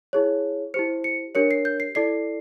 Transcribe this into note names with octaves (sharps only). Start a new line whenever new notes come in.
E4 G#4 C#5
E4 G4 C5 C#7
C#7
D4 G4 A#4 C#5 C#7
C7
G6
C7
E4 A4 D5 C7